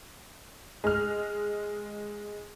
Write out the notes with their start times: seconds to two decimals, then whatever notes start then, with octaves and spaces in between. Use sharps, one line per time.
0.84 G#3 F6